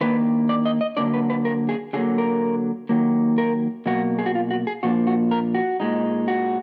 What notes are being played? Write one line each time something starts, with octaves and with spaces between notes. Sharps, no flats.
D#3 A#3 D4 B4
D5
D#5
D#5
D3 F#3 A#3 D4 D5
B4
B4
A#4
G#4
D3 F#3 A#3 G#4
A#4
D#3 F#3 A#3
A#4
B2 F#3 A#3 F#4
G#4
F#4
F4
F#4
G#4
A#2 F3 A#3 D4 F#4
F#4
A#4
F#4
A#2 G#3 D#4
F#4